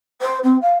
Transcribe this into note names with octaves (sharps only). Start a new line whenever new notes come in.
C5
C4
F5